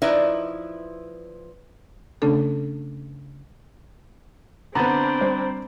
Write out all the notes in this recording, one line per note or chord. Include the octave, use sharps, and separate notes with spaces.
F3 D#4 E4 B4 D5 E5
C#3 A3 C#4 D4 A4
D3 B3 C4 D4 A#5 B5 A6
G3 C5